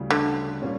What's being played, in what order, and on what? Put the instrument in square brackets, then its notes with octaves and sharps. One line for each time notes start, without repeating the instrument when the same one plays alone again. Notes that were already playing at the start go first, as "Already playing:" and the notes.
Already playing: [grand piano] D2 C#3 E3 G3
[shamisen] D3
[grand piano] A#2 G3 C#4